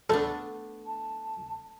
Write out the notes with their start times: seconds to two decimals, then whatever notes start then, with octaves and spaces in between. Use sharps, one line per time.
0.10 A3 B3 D4 A4
0.86 A5